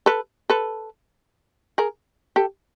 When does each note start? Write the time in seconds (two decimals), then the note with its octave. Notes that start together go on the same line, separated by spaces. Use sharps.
0.06 A4 B4
0.50 A4 B4
1.78 G#4 A#4
2.36 G4 A4